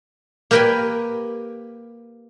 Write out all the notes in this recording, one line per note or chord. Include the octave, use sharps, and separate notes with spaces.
A#3 G4 A#4 B4 G5 G#5